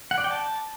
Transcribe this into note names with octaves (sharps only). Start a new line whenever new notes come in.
F#5
D5
G5
A5